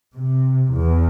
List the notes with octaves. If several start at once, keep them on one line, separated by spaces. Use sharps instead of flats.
C3
E2